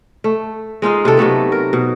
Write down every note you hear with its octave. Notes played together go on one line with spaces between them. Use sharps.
A3
G#3 D#4 F4 F5
C3 F4 A4
C3 F#3 A3 B3
A#4
B2